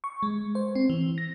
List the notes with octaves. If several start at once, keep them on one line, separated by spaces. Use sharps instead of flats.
C#6
G#3
C5
C4
E3
A#6